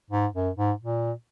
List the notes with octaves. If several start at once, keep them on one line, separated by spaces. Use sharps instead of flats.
G#2
F#2
G#2
A#2